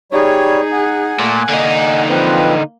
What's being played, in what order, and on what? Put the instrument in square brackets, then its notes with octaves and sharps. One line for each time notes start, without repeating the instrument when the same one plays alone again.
[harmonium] G3 C#5 [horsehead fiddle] D#4 G#4
[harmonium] F#5 G#5
[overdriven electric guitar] A#2 [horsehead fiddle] A3
[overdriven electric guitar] D3 D#4 [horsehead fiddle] A#3
[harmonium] F3 C4 B4